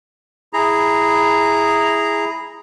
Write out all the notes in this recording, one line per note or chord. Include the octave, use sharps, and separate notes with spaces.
E4 G#4 A#5